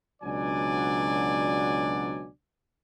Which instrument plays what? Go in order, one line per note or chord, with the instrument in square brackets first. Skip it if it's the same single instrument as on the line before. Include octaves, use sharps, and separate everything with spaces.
[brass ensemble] C#2 B2 F#3 D4 D5 G#5